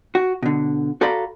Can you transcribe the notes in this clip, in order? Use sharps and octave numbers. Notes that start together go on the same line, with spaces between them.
F#4
B2 D3
F#4 A4 D5 F5 A#5 B5